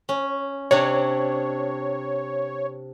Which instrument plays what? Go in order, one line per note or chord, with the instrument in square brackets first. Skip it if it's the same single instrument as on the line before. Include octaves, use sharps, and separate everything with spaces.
[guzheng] C#4
[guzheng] C3 D4 [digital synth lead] C#5